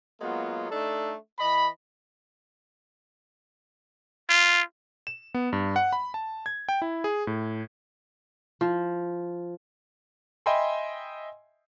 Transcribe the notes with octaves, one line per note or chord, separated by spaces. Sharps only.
F#3 G#3 A#3 B3 F4
A3 D4 D#4 A4
E3 D#5 B5
F4
E7
B3
G2
F#5
B5
A5
G#6
G5
E4
G#4
A2
F3
D#5 E5 G5 G#5 B5 C6